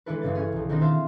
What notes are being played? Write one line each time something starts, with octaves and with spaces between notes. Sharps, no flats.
E3 G#3 D4 E4 A4 B4
G1 G2 C#3 A6
C#4 G#4
B1 F3
D#3 E3 B3 C4 D4 D#4
C5 E5 F5 A5